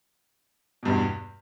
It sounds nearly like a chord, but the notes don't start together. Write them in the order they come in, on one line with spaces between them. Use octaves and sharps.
B2 G2 E2